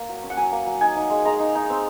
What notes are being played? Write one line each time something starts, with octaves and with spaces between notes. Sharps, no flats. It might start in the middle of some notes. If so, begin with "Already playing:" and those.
Already playing: A#3
F#3
C#4
F#5
F#3 G#5
A#3
F#3
D#4 G#5
D#4
G#3
G#3 A#5
D#4
D#4
C4